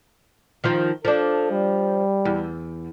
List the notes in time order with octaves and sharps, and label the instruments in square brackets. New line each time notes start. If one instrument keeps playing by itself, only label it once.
[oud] D#3 F3 F4
[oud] F3 D4 [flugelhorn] A4
[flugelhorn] G3
[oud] E2